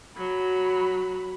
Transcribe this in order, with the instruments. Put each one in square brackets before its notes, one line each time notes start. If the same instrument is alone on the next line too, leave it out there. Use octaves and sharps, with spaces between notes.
[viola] F#3 B5